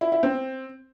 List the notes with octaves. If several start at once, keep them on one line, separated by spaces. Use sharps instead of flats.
E4
E4
C4